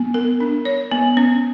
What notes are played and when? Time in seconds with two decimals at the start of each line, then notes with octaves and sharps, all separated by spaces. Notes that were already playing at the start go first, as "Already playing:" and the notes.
Already playing: B3
0.14 A#4
0.40 D4
0.65 C#5
0.92 B3
1.17 C#4